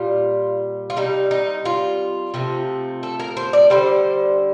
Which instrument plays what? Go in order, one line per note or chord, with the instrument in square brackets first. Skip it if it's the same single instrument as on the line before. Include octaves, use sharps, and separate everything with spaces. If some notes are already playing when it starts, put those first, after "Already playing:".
Already playing: [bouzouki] A#2 G3 F4
F4
C3 G3 D#4
D#4
F4
C3 F3 A3
A4
A#4
C5
D5
D3 G3 C5